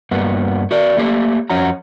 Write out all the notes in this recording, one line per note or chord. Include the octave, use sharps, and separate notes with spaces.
G2 A#3 B3 F#4
F#4 A#4 D5
A3 A#3 G4 A4
F2 C#4 F#4 A#5